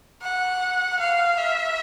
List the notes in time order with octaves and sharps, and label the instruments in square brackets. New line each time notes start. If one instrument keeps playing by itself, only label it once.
[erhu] F#5
F5
E5